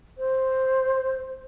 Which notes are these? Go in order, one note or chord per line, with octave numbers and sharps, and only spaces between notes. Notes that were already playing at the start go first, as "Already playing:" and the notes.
C5